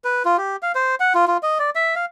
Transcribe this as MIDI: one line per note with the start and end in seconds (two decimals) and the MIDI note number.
0.04 0.23 71
0.25 0.37 65
0.38 0.56 67
0.63 0.72 77
0.75 0.95 72
1.00 1.13 78
1.15 1.25 65
1.28 1.37 65
1.43 1.58 75
1.59 1.70 74
1.75 1.95 76
1.95 2.06 77